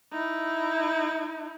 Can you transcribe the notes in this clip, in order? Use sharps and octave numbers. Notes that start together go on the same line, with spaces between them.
D#4 E4